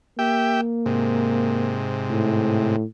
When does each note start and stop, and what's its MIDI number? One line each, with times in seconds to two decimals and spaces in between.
0.19 1.81 58
0.19 0.61 67
0.19 0.61 76
0.19 0.61 79
0.86 2.76 44
0.86 2.76 48
2.10 2.84 45